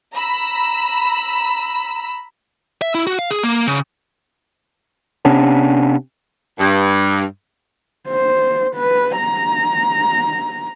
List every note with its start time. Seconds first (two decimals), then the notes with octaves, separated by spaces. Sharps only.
0.13 A#5 B5 E6
2.82 E5
2.95 E4
3.07 F#4
3.19 F5
3.31 G#4
3.43 A#3
3.67 C#3
5.25 C3 B3 C#4 D4
6.59 G2
8.09 C5
8.76 B4
9.20 A#5